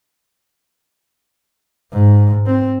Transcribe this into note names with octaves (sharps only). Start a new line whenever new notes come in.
G#2
C4